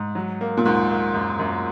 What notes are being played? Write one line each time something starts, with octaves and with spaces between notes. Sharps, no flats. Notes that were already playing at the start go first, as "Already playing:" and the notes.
Already playing: G#2
F#3
A#3
A#2
D#2 G#2
A#3
F#2
F#2